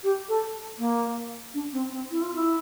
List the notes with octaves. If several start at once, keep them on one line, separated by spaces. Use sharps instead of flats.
G4
A4
A#3
D4
C4
C4
E4
F4
E4